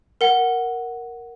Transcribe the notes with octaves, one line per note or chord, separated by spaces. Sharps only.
A#4 F#5